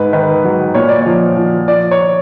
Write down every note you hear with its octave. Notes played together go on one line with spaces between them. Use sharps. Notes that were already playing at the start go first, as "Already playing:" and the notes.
Already playing: G#2 B4
D#3 B4
F#3
A#2 C#5
D5
F3 C#5
F3
F3 D5
C#5